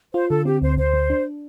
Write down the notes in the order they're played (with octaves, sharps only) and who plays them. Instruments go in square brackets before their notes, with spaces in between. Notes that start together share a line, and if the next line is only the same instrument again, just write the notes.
[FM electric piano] F4 [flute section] C5
[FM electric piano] D3 [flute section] A4
[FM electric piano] C4 [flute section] G4
[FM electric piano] D2 [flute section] C5
[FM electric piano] D2 [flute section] C5
[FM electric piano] D2
D4